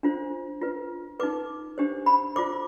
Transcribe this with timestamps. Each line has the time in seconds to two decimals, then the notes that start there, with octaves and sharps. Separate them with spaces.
0.03 D4 F4 C5
0.61 F4 B4
1.20 D#4 B4 D6
1.78 D4 G4 C5
2.06 B5
2.36 F4 C5 D6